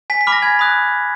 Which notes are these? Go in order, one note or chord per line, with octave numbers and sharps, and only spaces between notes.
G#5 B6
B6
B5 D6 F6
A#6
G#5 G#6
B5 D#6 F#6